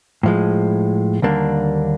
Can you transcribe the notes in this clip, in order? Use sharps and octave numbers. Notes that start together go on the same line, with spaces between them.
A2 F3 G#3
D#2 D3 G3 A#3 D4